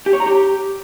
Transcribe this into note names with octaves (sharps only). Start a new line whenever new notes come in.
G4
C#5
A#5
G4